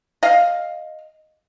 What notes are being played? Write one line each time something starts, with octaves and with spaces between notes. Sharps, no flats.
D#5 F5